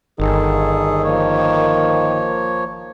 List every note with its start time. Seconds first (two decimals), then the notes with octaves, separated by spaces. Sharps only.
0.20 G1 D#3 G#4 A4
1.02 F3 A#3 C#5